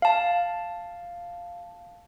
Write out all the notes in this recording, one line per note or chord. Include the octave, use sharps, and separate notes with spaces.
F5 A5